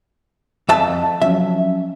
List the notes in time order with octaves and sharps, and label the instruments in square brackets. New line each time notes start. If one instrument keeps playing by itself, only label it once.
[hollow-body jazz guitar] F2 E5 A5
[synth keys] F3 F#3 C#4 [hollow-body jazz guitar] E5